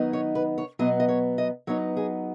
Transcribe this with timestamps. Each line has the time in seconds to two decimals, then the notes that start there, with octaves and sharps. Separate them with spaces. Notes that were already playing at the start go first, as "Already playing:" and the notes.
Already playing: D#3 F#3 B3 D#4
0.13 C#5
0.35 B4
0.58 C#5
0.79 B2 F#3 B3 D#5
1.00 D#5
1.08 C#5
1.38 D#5
1.67 F#3 B3 D#4 C#5
1.97 G#4